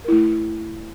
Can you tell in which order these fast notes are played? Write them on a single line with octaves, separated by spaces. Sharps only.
A#4 E4 A3